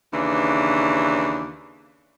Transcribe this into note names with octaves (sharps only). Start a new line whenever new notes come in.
D#2 C#3 E3 D4